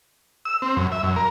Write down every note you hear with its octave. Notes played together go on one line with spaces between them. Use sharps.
E6
C4
F#2
E5
F#2
A#4